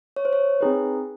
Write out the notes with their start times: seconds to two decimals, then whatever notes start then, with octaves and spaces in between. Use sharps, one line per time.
0.16 C#5
0.25 C5
0.33 C#5
0.61 C4 D#4 G#4 B4